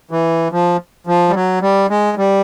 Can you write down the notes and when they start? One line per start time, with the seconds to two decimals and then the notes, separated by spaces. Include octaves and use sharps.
0.11 E3
0.52 F3
1.07 F3
1.29 G3
1.34 F#3
1.62 G3
1.90 G#3
2.17 G3